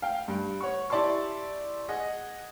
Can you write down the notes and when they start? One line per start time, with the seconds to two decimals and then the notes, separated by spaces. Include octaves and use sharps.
0.02 F5 G5
0.28 G2
0.61 C#5 F#5 C#6
0.90 E4 G4 D5 A5 C6 C#6
1.88 G#4 D#5 F#5